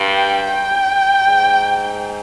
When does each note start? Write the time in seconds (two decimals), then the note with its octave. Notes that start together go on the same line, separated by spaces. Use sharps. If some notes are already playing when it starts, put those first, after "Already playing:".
Already playing: G2
0.15 G5
0.52 G5
1.26 G#2